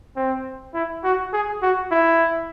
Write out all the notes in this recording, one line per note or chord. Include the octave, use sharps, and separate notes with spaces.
C4
E4
F#4
G#4
F#4
E4